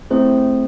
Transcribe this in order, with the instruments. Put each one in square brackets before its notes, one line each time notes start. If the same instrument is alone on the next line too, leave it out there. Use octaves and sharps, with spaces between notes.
[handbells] A3 C4 E4 G#4 C5